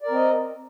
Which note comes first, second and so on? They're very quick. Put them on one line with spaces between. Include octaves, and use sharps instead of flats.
D5 A#4 C4 D#5